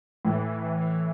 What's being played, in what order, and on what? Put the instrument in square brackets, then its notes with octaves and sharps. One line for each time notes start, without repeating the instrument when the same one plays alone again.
[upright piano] A2 [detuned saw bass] E3